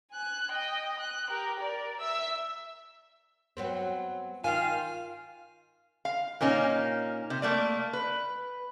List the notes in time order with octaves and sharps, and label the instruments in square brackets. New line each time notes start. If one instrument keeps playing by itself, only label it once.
[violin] G#5 F#6
D#5 G5
F#6
G4 A#4
A#4 D5
E5 E6
[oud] F#3 B3 C4
[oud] D#3 [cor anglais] F4 [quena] F5 [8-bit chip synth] G#5
[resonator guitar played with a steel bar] F5
A#2 A#3 C#4 D#4
C3
A3 A#3 D5
B4